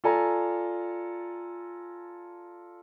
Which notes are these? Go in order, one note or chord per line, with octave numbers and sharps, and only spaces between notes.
F4 A4 D5 G#5 A#5